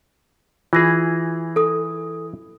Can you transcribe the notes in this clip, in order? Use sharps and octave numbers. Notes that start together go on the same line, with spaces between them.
E3 F4 G#4 A#6
A4 D#6